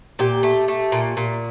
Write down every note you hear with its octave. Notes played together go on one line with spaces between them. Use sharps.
A#2 G4
A3
A3
A#2
A#2